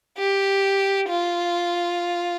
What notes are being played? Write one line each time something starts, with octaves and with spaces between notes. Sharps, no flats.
G4
F4